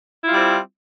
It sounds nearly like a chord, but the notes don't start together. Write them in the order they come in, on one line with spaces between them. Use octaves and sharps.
E4 F4 G3 C4